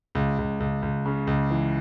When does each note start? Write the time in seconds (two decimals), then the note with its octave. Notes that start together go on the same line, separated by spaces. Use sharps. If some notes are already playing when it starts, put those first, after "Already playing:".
0.15 C#2
0.38 C#2
0.60 C#2
0.82 C#2
1.05 C#3
1.27 C#2
1.50 E3